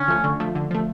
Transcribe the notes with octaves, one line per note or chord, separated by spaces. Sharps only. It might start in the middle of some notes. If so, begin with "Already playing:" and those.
Already playing: D3 C#4
F3 A3
D3
F3 A3
D3
F3 A3